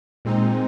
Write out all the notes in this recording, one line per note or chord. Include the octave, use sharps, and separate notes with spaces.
A#2 G#3 C4 D#4